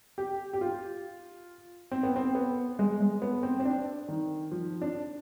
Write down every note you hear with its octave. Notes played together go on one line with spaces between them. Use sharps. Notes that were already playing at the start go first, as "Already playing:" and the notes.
G4
G4
F4
C4
B3
C4
B3
G#3
G#3
B3
C4
C4
D4
D#3
F3
D4